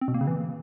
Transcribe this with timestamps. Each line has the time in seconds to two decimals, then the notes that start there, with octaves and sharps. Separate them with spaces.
0.01 C4
0.08 B2
0.14 A#3
0.21 C#3
0.27 E3